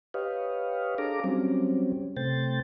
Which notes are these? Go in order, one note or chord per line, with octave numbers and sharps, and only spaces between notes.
G4 B4 C#5 D#5 F5
D4 G#4 A4 F5 A#5 D6
F#3 G3 C4 C#4
C3 A3 C5 G5 A6